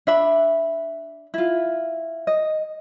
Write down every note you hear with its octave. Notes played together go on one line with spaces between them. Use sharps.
D4 E5 B5
E4 F4
D#5